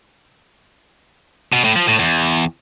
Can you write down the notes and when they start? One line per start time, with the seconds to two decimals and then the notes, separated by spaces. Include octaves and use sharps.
1.53 B2
1.64 A2
1.76 F3
1.88 A2
1.99 E2